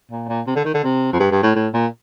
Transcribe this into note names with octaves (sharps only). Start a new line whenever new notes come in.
A#2
A#2
C3
D3
D#3
D3
C3
F2
G2
G2
A2
A2
A#2